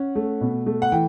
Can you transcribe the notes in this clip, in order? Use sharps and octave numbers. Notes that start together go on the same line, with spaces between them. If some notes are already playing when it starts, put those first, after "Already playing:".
Already playing: C#4 F#5
A3
B2
A3
F#5
E3 G5